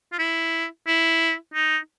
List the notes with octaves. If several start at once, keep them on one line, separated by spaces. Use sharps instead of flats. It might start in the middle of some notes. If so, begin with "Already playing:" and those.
F4
E4
E4
D#4